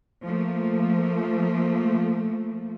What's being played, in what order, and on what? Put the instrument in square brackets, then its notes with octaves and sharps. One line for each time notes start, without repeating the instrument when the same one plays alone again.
[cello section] F3 A3 A#3